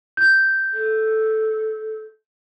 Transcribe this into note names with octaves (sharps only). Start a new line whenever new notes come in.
G6
A4